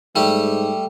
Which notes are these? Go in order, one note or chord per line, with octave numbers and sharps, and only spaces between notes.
G#2 G3 A3 G4